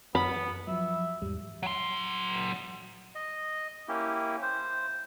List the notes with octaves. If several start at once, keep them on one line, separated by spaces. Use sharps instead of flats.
F#2 B3 B5
F3 F#3 E5
E2 G#2 G3
F#3 C6
D#5
A#3 C#4 E4 G4
C5